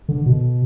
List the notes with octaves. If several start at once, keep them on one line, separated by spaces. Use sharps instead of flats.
D3
B2